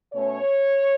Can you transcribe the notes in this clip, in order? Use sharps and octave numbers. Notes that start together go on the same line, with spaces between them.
B2 A3 C#4 C#5